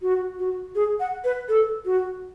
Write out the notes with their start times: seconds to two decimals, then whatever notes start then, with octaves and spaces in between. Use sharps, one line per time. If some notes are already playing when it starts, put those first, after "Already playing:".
0.02 F#4
0.39 F#4
0.75 G#4
1.00 F#5
1.24 B4
1.49 A4
1.86 F#4